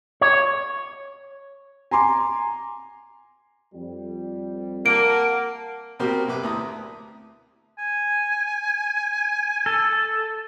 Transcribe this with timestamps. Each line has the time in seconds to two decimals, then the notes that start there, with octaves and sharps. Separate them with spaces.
0.21 C#5
1.91 G#5 A#5 C6 D6
3.74 F2 G3
4.86 A#3 F#5 A5 D7
5.99 B2 A#3 C4 F#4 G4 A#4
6.28 B1 C3 B4 D6
6.43 D2 E4 A5 A#5 D#6
7.79 G#5
9.66 A4